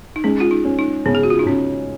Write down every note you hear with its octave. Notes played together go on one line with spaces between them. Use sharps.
D#4
G#3 C#4
F4
D#4
C#4
D#4
C#3 B3
G#4
F#4
F4
D#4
C#3 C#4